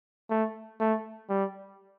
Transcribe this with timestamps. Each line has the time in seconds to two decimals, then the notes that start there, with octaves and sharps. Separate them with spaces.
0.30 A3
0.80 A3
1.29 G3